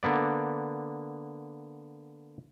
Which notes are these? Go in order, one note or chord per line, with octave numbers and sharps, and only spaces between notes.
D3 A#3 B3 D5